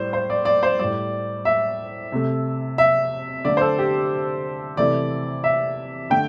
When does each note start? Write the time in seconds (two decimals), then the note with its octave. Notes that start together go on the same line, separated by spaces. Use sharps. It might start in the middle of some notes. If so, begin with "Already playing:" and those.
Already playing: A2 G3 C5
0.13 C5
0.30 D5
0.45 D5
0.63 C5
0.79 A2 G3 D5
1.45 E5
2.12 C3 A3
2.78 E5
3.45 D3 A3 D5
3.57 C5
3.61 A4
3.79 G4
4.77 C3 E3 A3 D5
5.44 E5
6.10 D3 A3 G5